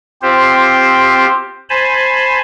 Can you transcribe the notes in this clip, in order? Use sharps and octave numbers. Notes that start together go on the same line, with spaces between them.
C4 F4 G4 C5
C5 G#5 A5 B5